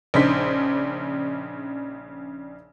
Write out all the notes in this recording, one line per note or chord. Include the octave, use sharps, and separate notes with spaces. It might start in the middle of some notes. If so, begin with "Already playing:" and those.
A#1 C#3 D4 D#4 C5 B6